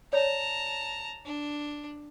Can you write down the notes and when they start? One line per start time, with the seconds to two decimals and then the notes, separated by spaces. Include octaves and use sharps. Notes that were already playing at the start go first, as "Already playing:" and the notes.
0.13 C#5 D5 A5 A#5
1.25 D4